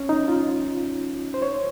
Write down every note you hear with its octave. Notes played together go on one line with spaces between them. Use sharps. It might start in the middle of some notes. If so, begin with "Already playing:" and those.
Already playing: C#4
D#4
F4
C5
C#5